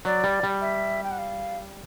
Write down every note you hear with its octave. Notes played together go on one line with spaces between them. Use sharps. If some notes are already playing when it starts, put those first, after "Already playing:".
F#3 D5
G3
G3
E5
G5
F#5
F5